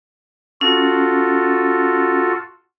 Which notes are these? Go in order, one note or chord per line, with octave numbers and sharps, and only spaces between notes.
C#4 F4 F#4 A4